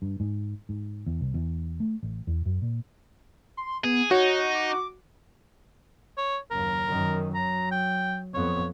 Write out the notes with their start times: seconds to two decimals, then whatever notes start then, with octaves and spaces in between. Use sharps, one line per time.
0.02 G2
0.20 G#2
0.69 G#2
1.07 E2
1.21 C2
1.34 E2
1.80 A3
2.03 A1
2.27 E2
2.46 F#2
2.62 A#2
3.57 C6
3.84 B3 G#4
4.11 D#4 F#4 C#5
4.55 D6
6.17 C#5
6.51 F#1 D#2 A#4
6.88 F#2 D#3
7.34 F#3 A#5
7.71 G5
8.34 F2 B3 C#5